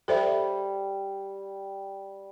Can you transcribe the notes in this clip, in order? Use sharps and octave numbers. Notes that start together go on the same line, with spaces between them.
G3 A4 C5 E5